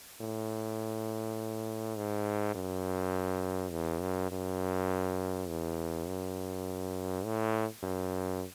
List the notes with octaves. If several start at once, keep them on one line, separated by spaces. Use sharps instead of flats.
A2
G#2
F#2
E2
F#2
F#2
E2
F#2
A2
F#2